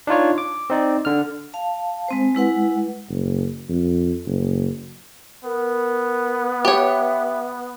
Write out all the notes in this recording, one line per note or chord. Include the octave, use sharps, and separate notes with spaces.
D4 D#4 F4 C#5
D6
C4 D#4 D5
D3 F6
F5 A5
G#3 C4 C5
G#3 E4 B4 F#5
F#1
F2
F#1
B3 A#4
G4 C#5 E5